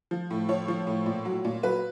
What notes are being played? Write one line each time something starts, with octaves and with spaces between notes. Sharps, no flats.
F3
A2
F3 C#5
F3
A2
A#2
F#3
A#2
F#3 B4